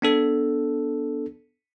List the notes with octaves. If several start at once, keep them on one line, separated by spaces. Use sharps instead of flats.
B3 D4 A4